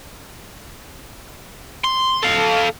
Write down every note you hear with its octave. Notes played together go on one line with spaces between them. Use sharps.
C6
A4 F5